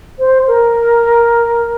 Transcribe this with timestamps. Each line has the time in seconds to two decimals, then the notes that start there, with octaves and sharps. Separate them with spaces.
0.19 C5
0.47 A#4